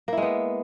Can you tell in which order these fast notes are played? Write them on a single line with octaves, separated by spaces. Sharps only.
A#3 E4 G#3 B3